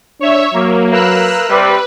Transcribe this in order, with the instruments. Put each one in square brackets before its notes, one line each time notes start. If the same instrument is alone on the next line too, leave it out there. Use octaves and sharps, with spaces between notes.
[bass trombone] D4 [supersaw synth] C#5 E5
[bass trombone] F#3 [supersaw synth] A#3
[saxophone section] A#3 A#4 B4 [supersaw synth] E6 F#6
[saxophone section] C3 G3 [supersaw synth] B4